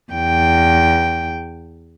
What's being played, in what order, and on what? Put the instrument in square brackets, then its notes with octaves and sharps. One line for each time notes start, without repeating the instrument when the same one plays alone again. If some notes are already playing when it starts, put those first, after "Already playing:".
[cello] E2 G5